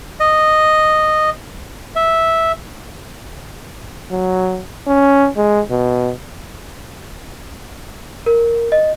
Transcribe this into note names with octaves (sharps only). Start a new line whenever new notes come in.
D#5
E5
F#3
C#4
G#3
B2
A#4
D#5